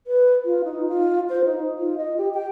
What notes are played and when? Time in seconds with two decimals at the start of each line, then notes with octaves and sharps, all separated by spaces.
0.07 B4
0.45 F4
0.64 D#4
0.88 F4
1.29 C5
1.45 D#4
1.78 F4
1.98 D#5
2.18 G4
2.34 G5